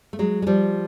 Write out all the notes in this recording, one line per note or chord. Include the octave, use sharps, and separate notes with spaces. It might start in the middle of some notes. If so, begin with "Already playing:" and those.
A3
F#3 G#3
G#3
F3 G3